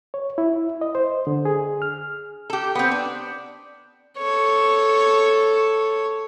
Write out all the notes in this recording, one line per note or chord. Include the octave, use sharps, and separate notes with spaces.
C#5
E4
D#5
C5
D3
G#4
F6
G4 A4
B3 C4
D4
A4 C#5